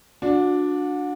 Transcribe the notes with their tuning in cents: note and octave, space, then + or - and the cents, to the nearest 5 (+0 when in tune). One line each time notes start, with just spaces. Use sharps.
D4 +0 F#4 -35